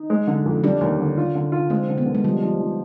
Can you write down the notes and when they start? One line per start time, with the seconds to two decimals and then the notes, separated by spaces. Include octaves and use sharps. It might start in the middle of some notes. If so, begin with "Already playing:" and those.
Already playing: D#4
0.10 G#3
0.27 D3
0.46 F2
0.63 G3 D4
0.81 D#2
1.00 D3
1.18 F4
1.35 D3
1.52 F4
1.70 G#3 C4
1.89 D3
1.98 B3
2.06 D3
2.15 G#3
2.24 F3 G3
2.42 F3
2.60 F3